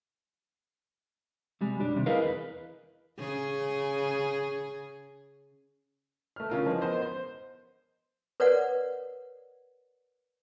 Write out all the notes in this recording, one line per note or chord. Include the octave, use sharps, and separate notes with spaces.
C3 G3 G#3
B1 F#2 G3 D4
D#2 C3
E4 G#4 A#4 B4 D#5 F5
E2 B4
C#3 G#4
A3 F6
C#3 F4 A#4
E3 F3 G#3
B3 A#4 C5 D#5
C5
A#4 B4 C#5 D5 F#5